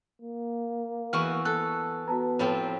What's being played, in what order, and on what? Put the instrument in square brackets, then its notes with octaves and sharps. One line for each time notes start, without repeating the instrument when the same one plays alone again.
[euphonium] A#3
[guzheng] E2 E3 F#4 [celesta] C#6 F6
[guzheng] A4 [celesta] F#6
[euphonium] B3 [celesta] F#4 A5 A#5
[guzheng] A2 F3 C4